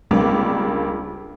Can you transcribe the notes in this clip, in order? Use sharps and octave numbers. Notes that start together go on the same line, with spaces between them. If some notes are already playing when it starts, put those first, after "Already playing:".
C#2 G3 A#3 C4 D4 D6